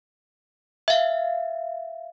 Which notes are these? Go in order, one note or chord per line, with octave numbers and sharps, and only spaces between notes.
E5 F5